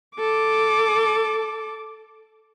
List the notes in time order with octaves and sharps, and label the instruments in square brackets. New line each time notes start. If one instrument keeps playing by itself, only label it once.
[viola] A4 D6